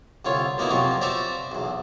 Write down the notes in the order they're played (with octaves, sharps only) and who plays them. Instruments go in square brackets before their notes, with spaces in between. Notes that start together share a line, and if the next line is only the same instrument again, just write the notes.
[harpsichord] C2 D3 F4 C#5
B2 A#3 B3 D#4 E4
F2 C3 F#3 F4 C#6
C5 D5 E5 A5 A#5 C#6
B1 E2